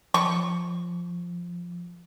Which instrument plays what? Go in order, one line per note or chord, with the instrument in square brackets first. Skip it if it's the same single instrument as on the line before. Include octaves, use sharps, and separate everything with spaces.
[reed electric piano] F3 [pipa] C#6